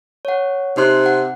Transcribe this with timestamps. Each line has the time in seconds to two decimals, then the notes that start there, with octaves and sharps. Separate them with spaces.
0.25 C#5 F#5
0.77 C3 D#4 C6 F#6
1.06 F#5